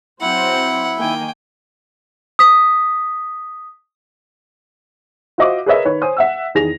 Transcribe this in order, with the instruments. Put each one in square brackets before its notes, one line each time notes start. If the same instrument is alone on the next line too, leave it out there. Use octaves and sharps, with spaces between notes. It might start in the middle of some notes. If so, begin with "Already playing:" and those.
[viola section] F#3 C4 C5 [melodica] E4 [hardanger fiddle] F#5
[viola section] D#3 A#3 G#5 [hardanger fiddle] G5
[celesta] D#6 B6
[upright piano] F4 F#4 C5 D#5 E5 D6
G#4 A#4 B4 C#5 D#5 E5
D#3 B4 C#5
C5 C#5 G#5 D#6
E5 F#5 E6
E2 D#3 G#4 A#6 F7